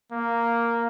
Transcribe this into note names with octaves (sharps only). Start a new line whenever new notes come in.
A#3